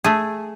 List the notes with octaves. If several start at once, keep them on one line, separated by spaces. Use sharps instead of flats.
A3 G#4